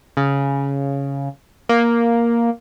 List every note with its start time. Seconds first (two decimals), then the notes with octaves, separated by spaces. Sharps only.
0.17 C#3
1.69 A#3